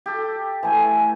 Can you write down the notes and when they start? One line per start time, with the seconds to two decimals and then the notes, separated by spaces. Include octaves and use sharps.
0.06 G4 A4
0.63 E3 A3 G#5